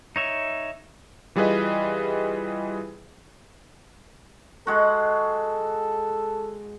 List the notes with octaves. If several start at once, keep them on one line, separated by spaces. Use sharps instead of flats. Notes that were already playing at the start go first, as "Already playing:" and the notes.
D#4 C#5 E5
E3 G3 F4 G#4 B4 D#5
G#3 F#4 A4